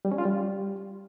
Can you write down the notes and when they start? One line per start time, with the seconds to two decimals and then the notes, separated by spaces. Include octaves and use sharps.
0.05 G3
0.12 C#4
0.18 F4
0.25 G3